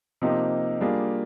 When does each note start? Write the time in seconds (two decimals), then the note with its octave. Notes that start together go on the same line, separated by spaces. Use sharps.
0.22 C3 F3 A#3 D#4 G4
0.81 G3 A#3 D4 F4 G#4